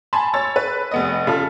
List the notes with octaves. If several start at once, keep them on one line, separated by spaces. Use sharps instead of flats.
G#5 A5 B5 C6
C#5 E6 A6
B4
F1 B3 D#5
C#3 F4 A4